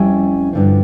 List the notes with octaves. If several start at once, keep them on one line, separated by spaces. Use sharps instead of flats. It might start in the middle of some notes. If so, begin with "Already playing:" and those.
Already playing: F2 G3 C#4 E4
G2 D3 F3